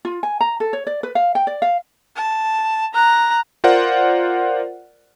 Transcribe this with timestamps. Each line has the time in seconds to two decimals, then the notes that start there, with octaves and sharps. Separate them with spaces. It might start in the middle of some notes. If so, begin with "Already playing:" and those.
0.05 F4
0.23 G#5
0.41 A#5
0.60 A4
0.73 C#5
0.87 D5
1.03 B4
1.15 F5
1.35 G5
1.47 D5
1.62 F5
2.16 A5
2.94 A#5 F#6
3.64 F4 A#4 C5 D5 F#5